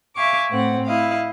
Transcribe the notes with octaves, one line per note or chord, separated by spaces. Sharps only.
E5 F5 G#5 C#6 D6
A2 C4 F#5
E4 D#5 F5